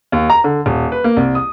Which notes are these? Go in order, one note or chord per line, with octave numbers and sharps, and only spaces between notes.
D#2
A#5
D3
D#1
B4
A#3
C2
D#6